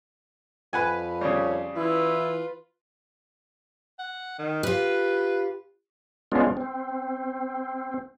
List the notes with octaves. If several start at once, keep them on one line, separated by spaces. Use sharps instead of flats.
F2 B4 F#5 G#5
C#3 G3 C#5
E3 E4 F4 B4
F#5
D#3
F4 G4 B4
G#3 B3 C#4 D4 F4
C4